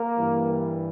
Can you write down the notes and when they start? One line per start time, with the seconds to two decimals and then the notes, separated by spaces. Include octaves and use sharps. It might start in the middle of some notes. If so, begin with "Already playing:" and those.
Already playing: A#3
0.18 G2 E3 G3